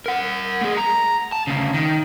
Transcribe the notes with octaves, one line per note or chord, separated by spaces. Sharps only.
A#4 F#5
A3 G#4
A#5
A5
D2 C#3
D#3